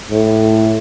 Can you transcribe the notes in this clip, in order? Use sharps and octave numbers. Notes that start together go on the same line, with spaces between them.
A2